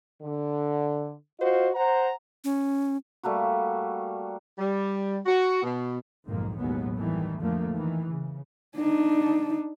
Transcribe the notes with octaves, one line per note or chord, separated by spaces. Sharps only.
D3
F4 F#4 C5 D#5
C5 F#5 A#5
C#4
G3 A3 A#3 F#4
G3
F#4
B2
B1 F2 G#2 D#3 A#3
A1 D#2 B2 F#3 G#3 B3
G2 D#3 E3 A3
F2 D3 F3 A3 A#3
D#3 E3
C#3
D4 D#4